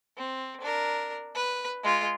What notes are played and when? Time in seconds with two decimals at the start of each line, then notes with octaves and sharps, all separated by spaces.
0.17 C4
0.61 D4 A#4
1.35 B4
1.83 G#3 F4